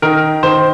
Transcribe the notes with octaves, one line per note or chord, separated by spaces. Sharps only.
D#3 A#4
D#3 C5